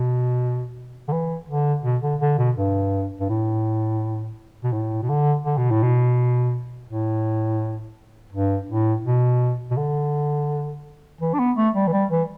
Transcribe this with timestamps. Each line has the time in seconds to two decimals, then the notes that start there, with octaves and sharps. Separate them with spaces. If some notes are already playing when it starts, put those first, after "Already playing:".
Already playing: B2
1.08 D3
1.12 E3
1.48 D3
1.84 B2
2.03 D3
2.21 D3
2.38 B2
2.56 G2
3.20 G2
3.29 A2
4.64 B2
4.73 A2
5.02 B2
5.09 D3
5.45 D3
5.58 B2
5.71 A2
5.83 B2
6.89 A2
8.33 G2
8.69 A2
9.05 B2
9.71 B2
9.77 D3
11.21 E3
11.34 D4
11.39 B3
11.57 A3
11.75 G3
11.87 E3
11.93 G3
12.11 E3